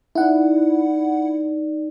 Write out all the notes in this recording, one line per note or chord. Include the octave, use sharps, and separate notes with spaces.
D#4 E4 D5 F#5